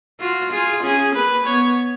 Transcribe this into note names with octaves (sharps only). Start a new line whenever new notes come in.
F4 F#4
F4 G#4
C#4 G#4
A#3 B4
B3 C#5